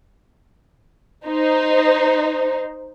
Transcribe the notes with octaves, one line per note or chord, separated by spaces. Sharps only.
D#4 C5